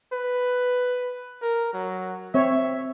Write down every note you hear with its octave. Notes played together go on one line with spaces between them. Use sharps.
B4
A#4
F#3
C4 C#5 E5